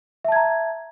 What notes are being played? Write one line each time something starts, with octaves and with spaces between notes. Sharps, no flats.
E5 A5 A#5 G#6